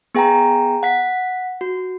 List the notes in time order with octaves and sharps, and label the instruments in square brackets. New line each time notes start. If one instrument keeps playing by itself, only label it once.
[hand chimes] B3 G#4 G5 G#5 A#5
F#5 B6
F#4